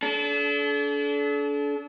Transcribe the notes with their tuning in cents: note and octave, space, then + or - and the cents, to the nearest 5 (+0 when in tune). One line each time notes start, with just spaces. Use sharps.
D4 -30 A4 -40